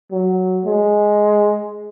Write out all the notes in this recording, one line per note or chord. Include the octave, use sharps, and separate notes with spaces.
F#3
G#3